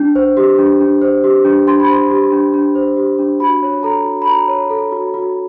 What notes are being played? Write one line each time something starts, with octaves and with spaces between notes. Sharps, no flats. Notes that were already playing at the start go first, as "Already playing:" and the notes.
Already playing: D4
C5
G4
D4
D4
C5
G4
D4
D4 C6
B5
C5 C6
G4
D4
D4
C5
G4
D4
F#4 B5
C#5
A4 A#5
F#4
B5
F#4 A#5
C#5
A4
F#4
F#4